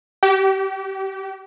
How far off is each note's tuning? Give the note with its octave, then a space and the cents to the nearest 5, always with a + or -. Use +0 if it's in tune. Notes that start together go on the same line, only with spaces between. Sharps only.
G4 -30